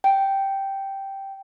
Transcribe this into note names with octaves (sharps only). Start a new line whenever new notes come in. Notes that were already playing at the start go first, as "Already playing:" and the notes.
G5